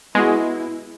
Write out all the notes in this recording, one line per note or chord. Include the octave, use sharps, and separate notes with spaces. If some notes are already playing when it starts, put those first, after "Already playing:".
G#3 B3 E4 F#4